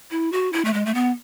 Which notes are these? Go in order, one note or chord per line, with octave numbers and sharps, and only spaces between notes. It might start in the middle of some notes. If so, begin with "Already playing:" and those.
E4
F#4
E4
A3
G#3
A3
B3